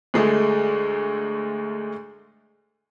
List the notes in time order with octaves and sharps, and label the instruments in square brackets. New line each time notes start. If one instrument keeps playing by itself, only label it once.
[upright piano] D2 G#3 A3